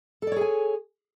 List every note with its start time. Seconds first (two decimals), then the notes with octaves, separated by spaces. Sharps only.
0.22 A4
0.27 D5
0.32 C#5
0.36 G#4
0.41 G#5